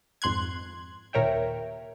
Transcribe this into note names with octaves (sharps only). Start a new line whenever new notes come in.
G#1 F2 C6 F#6 G#6
D#2 A#2 A#4 C#5 E5 G5